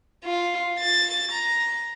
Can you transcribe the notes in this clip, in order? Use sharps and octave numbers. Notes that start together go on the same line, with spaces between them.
F4
A6
A#5